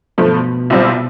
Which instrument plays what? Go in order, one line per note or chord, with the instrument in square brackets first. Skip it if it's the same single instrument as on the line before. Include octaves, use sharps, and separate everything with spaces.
[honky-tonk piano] G2 F3 A3 [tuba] B2
[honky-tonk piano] C2 C3 G3 C4 F4